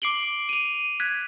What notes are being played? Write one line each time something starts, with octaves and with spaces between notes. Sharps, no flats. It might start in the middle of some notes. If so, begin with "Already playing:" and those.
D6 C7 D7 F#7 G7
D#7 F7
F#6 G#6 B6